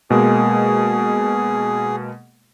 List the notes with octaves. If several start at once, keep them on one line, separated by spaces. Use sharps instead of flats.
B2 G#3 A#3 G#4